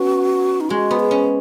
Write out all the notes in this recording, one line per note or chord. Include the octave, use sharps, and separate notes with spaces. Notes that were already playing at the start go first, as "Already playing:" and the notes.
Already playing: B3 C#4 F#4
D#4
G#3 F#4
B3
G#4
C#4